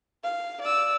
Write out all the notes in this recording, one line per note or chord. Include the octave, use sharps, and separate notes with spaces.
F5
D5 E6